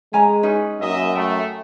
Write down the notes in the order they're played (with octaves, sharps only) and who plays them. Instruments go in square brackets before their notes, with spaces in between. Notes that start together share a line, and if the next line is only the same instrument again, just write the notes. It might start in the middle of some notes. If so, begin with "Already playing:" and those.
[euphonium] G#3 [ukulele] C#4 G#5 A#5
[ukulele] C#4 D#4 B4
[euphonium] F#2 [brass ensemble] A#3 D#5 E5
[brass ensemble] A3 [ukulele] G5